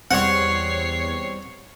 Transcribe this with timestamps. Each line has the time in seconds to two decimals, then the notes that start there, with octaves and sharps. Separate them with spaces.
0.11 E2 G3 C4 C#5 F#5 C#6 C7